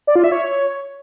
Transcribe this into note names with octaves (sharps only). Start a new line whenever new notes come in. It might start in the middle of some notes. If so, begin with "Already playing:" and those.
D5
F4
E5
C#5